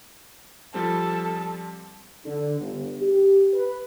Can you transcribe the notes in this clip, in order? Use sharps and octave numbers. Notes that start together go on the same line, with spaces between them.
F3 G3 C4 A4
D3
G1
G4
B4